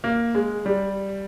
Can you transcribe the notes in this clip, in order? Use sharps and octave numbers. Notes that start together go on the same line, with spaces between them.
A#3
G#3
G3